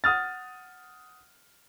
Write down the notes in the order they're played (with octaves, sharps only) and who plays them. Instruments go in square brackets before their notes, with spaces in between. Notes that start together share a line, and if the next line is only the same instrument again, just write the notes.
[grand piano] F#5 D#6 F6 A6